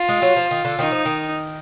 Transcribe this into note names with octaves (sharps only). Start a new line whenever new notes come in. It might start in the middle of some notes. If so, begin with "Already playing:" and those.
Already playing: F4
G#3
F#3
F3
D#3
D3
D#3 D#4
F3
D#3